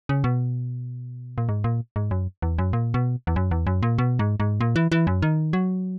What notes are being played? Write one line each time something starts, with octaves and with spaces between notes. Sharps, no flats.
C#3
B2
A#2
G#2
A#2
G#2
F#2
E2
F#2
A#2
B2
E2
F#2
E2
F#2
A#2
B2
G#2
G#2
A#2
E3
E3
F#2
D#3
F#3